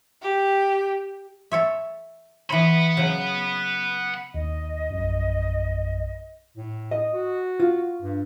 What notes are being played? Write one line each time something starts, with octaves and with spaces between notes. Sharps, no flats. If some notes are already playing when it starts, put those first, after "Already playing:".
G4
A4 C#5 E5
E3 C#5 F#5 B5
C#3 F#3
D#2 D#5
A#1 F#2
A2
D#5
F#4
F4
G2